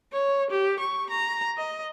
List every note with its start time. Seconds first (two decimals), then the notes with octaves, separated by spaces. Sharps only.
0.12 C#5
0.50 G4
0.80 C#6
1.10 A#5
1.58 D#5